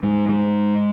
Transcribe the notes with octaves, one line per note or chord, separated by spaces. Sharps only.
G#2 G#3
G#3